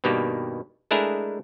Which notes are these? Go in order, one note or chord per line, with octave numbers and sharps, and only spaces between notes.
G2 B2 D#3 G3 A#3 G4
G#3 A3 D4 E4 G#4 A#4